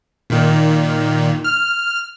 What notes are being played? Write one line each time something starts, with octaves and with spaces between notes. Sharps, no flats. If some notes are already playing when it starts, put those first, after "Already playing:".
A#2 D#3
F6